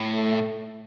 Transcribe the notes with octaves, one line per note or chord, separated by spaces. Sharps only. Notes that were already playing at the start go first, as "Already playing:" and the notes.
Already playing: A2
A3